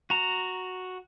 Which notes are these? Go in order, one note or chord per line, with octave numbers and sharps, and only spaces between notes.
F#4 A#5